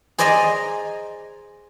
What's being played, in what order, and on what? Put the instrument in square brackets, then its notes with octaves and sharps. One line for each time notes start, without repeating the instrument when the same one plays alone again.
[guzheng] G#4 C5 D5 D#5 G#5 A#5